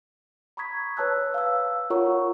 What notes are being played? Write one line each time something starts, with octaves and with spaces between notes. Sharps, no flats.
A#5 B5 C#6 D#6 G#6 B6
B4 C#5 A5 E6 F#6
F5 E6
F4 A#4 C#5 F#5 A#5 C#6